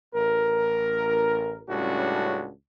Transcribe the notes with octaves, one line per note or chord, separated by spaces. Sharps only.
A1 A#4
C#2 A2 G3 C#4 D4 F#4